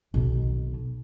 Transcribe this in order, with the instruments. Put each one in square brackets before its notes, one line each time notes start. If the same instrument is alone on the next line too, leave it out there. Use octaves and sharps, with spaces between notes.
[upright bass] B1 D#3